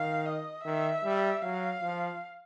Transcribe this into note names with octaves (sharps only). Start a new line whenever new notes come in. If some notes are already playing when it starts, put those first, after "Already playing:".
Already playing: D#3 F5
D#5
D#3 E5
G3
F#3 F5
F3